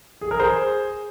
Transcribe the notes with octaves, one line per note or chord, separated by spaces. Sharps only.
G#4
A#4
G#4 C5